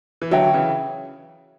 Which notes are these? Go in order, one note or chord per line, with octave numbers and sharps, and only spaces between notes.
E3
D3 F#3 F#4 C#5 E5 G5
C#3 E3